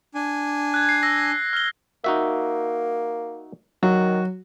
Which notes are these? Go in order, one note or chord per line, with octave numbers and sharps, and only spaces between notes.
D4 G#5
F#6 G#6
C7
E6 A#6
F6 G7
A#3 D#4 F#4 E5
D#3 F#3 F#4